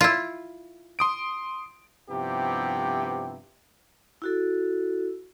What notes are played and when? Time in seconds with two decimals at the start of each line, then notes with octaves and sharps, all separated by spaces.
0.01 E4 F4
0.99 C6 D#6 D7
2.10 G2 C3 F3 B3 E4 G4
4.22 E4 F#4 A4